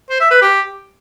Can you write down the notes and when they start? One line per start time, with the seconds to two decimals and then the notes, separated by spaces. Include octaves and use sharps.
0.10 C5
0.20 E5
0.31 B4
0.42 G4